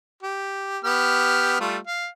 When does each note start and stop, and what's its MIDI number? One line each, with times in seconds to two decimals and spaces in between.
0.23 0.78 67
0.84 1.59 59
0.84 1.59 67
0.84 1.59 89
1.60 1.77 55
1.60 1.77 57
1.60 1.77 65
1.87 2.08 77